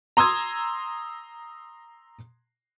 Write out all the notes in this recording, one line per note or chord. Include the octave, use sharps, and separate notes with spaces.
A#5 C6 D#6 E6 G#6